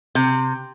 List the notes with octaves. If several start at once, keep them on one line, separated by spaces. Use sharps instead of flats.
C3